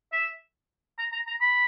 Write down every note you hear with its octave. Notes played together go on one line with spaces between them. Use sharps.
E5
A#5
A#5
A#5
B5